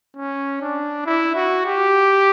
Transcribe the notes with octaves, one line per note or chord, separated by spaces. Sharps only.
C#4
D4
E4
F#4
G4